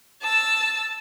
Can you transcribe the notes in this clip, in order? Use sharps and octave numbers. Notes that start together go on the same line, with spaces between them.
A5 E6